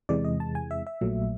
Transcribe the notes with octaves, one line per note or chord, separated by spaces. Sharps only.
E2 C3 E3 G#3 D5
D#5
A5
G#5
E5
E5
A#1 A#2 F#3 A3